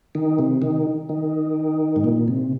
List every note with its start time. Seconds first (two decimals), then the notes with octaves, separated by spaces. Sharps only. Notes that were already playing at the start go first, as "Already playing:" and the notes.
0.15 D#3
0.39 C3
0.62 D#3
1.09 D#3
1.96 G#2
2.04 A#2
2.28 C3